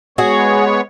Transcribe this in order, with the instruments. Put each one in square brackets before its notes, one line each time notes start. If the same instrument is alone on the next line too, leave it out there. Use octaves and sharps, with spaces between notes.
[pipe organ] G#3 B3 C#5 [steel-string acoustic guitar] F#4 G#4